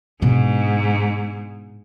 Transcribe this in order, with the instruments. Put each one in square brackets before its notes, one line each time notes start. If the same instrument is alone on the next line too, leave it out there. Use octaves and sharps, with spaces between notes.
[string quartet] G#2 [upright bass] B2 D4